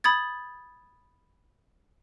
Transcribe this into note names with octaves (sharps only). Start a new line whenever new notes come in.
B5 D#6 G#6 A6